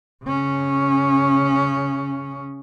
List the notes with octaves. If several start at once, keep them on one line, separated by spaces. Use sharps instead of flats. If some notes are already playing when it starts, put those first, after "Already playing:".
C#3 C#4